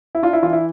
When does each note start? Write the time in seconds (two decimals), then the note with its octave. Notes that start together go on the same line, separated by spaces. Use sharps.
0.15 E4
0.22 D4 F4
0.33 E4
0.43 E3 F4
0.53 E4